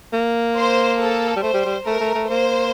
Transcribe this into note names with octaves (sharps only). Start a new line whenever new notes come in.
A#3
C5
A4
G3
A3 C5
G3
G3
A3 A#4
A3
A3
A#3 C5